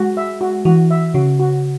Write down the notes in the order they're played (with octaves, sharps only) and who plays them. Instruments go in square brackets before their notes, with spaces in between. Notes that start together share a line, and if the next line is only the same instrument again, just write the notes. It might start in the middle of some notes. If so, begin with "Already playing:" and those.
Already playing: [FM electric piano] G#3 [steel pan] F#4
[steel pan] E5
F#4
[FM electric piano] E3 [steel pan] F#4
[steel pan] E5
[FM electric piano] C#3 [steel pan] F#4
[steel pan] F#4